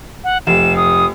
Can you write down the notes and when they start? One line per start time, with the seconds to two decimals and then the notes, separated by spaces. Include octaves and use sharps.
0.24 F#5
0.47 F1 E7
0.76 D#6